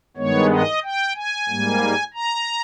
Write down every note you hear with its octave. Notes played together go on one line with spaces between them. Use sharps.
G2 D#3 G#3 B3 C#5
D#5
G5
G#5
G#2 G3 A#3
A#5